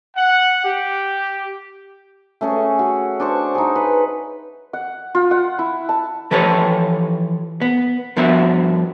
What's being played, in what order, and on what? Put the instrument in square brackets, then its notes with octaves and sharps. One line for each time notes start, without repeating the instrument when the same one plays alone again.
[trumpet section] F#5
G4
[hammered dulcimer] A3 C#4 G#4
F#4
D4 C5 C#6
D#4 G#4
B4
[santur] F#5
F4
F#5
E4
A5
[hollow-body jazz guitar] E3 F3 G4 A4 B4 C#5
B3
G2 F3 B3 F#4 E5